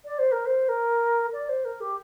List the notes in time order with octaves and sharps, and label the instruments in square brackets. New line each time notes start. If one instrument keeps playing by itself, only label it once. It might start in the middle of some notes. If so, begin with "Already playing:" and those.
[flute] D5
C5
A#4
C5
A#4
D5
C5
A#4
G4